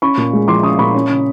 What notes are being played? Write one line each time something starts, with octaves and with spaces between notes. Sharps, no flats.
C#4 B5 C#6
A#2
G#3
F3 C6 D6
C#4 C#6 D#6
A#2 B5 C#6
C#4
C#3